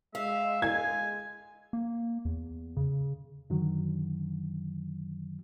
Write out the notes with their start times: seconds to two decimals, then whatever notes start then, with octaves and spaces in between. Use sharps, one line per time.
0.15 G#3 E5 F5
0.62 G#5 G#6
1.73 A#3
2.25 E2
2.76 C#3
3.50 F#2 D3 D#3 F#3